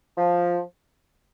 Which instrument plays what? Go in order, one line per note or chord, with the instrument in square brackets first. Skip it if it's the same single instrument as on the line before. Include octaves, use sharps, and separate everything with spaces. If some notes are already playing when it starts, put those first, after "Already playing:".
[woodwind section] F3